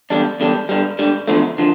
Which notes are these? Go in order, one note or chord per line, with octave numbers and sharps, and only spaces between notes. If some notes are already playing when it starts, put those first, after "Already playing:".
E2 D3 G3 D4
E2 D3 G3 D4
G2 D3 G3
G2 D3 G3
E2 D3 F3 A3
D3 F3